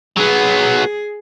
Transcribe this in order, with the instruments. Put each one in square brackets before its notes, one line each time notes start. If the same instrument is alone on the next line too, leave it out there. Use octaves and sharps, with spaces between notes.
[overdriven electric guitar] F#3 B3 [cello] G#4